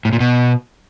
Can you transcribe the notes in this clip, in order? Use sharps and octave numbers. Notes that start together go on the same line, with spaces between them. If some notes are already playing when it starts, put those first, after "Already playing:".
A2
A#2
B2